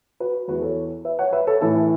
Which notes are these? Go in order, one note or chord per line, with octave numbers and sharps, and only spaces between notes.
F#4 B4
E2 E3 F#4 B4
A4 C#5
B4 E5
C#5 F#5
B4 E5
A4 C#5
A2 E3 E4 A4
E4